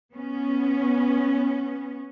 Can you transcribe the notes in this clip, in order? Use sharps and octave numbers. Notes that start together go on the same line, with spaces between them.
B3 C#4